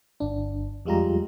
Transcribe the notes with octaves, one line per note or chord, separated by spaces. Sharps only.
G1 D4
F2 G3 G#3 F4 G4 A#5